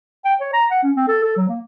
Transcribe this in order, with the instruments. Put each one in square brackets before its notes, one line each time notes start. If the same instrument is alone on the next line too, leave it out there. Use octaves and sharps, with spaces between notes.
[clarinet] G5
C#5
A#5
F#5
C#4
C4
A4
A4
F#3
A#3